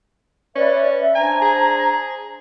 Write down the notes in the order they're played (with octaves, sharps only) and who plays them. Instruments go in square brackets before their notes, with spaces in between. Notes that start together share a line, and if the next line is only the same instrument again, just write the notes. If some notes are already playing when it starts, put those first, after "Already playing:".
[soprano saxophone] C#4 [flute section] B4 D5 E5
[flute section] E5
[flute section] D4 C5 A#5 [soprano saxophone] G#5
[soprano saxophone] G#4